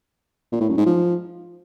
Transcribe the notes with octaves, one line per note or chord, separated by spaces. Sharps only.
A#2
A2
F#2
G#2
F3